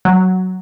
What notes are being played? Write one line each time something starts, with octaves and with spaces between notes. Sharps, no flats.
F#3